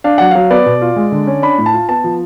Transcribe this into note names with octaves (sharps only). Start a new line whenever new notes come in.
D4 F5
F#3 F#5
F#3 F5
B3 D5
B2
F4
G#3
D3
C#4
D4 B5
A2
A5
F4
B3 A5
F3